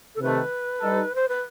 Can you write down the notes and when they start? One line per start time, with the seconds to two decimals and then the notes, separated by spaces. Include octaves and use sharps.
0.15 A4
0.20 C3 D#3 A3 B4
0.81 G3 D#4 A4
1.15 C5
1.28 B4